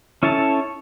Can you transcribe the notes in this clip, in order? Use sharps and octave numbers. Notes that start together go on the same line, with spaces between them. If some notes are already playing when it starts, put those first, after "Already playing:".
C#4 E4 A4 C#5 A5